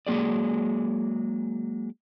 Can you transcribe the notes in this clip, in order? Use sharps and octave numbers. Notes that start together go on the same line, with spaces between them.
F#3 G#3 A#3 G#4 D5